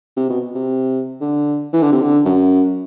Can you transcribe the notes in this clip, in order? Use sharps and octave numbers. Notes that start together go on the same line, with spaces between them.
C3
B2
C3
D3
E3
D3
C3
D3
F#2